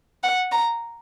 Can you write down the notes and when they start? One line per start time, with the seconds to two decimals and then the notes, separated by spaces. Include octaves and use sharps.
0.24 F#5
0.52 A#5